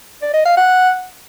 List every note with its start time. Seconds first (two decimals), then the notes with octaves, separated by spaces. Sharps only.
0.22 D5
0.34 D#5
0.45 F5
0.57 F#5